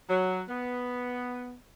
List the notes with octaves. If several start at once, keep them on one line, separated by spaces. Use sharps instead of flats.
F#3
B3